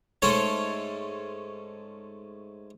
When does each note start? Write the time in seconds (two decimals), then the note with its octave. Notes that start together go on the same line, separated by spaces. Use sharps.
0.22 G#2 A3 C#4 A4 C5 C#5